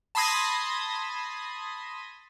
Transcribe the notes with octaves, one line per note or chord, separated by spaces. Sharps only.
A5 B5 C6 D#6 G#6 A#6